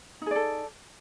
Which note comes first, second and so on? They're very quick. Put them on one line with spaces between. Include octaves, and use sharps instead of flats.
D#4 G#4 D5 A4